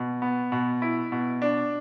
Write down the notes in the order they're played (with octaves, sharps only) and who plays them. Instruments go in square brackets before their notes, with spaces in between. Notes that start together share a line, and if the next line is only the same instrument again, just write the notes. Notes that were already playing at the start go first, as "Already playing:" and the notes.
Already playing: [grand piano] B2
B3
B2
E4
B2
D4